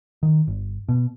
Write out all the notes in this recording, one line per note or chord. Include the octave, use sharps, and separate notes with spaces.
D#3
G1
B2